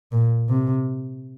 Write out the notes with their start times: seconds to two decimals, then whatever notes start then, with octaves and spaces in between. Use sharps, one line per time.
0.12 A#2
0.49 C3